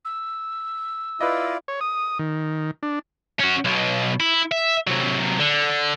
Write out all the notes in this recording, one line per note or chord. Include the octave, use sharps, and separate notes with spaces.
E6
E4 F4 B4 D5 D#5
C#5
D#6
D#3
D4
C#4 F#4
B1 B2
E4
E5
C3 F#3
D3